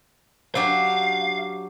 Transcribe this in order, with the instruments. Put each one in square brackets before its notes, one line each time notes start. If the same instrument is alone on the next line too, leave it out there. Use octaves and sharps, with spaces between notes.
[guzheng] F#3 D4 G4 [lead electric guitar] F5